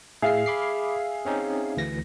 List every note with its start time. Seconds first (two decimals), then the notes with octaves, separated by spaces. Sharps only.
0.22 A2 G#4 E5 F5 C7
0.46 B5 D6 C7
1.25 C4 C#4 D#4
1.77 D2 E3 A#6